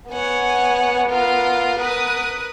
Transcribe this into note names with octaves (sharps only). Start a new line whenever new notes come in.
B3 C#5 F#5 G#5
F4 A#4 F5
A#4 B4 D#6